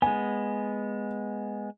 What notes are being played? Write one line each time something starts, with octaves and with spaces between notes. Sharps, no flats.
G#3 B3 G#5